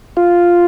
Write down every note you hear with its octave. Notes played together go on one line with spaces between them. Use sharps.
F4